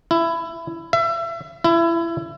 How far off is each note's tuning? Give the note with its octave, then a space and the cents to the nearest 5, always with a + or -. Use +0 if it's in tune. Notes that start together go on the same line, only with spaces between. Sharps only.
E4 +15
E5 +30
E4 +25